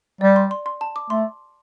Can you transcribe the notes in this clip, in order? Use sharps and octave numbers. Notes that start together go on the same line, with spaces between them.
G3 D5
C6
C6
C6
A5
D6
A3 C6